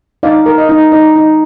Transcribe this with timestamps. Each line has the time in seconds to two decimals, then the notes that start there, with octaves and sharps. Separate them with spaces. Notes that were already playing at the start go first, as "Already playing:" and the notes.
0.23 D#4 D5 F5
0.46 A#4
0.58 D#5
0.69 D#4
0.92 D#4 D5
1.16 D#4